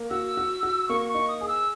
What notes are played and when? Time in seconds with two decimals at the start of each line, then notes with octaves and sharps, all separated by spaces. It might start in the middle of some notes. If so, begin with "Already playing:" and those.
Already playing: A#3
0.10 F#4 E6
0.37 F#4
0.63 F#4
0.89 A#3 C#6
1.09 C#6
1.15 D#4
1.28 D#6
1.41 G#4 D#6
1.48 E6